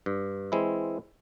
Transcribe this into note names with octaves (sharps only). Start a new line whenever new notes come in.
G2
E3 G#3 C4 E4